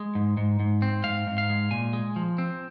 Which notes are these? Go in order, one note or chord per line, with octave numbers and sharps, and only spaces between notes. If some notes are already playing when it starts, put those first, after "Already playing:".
Already playing: G#3
G#2
G#2
G#2
C4
G#2 F5
G#2
F5
G#3
A#2 G#5
G#3
F3
C4